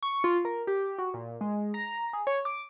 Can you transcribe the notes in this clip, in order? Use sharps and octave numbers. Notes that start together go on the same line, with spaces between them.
C#6
F4
A#4
G4
F#4
A#2
G#3
A#5
G#4
C#5
D6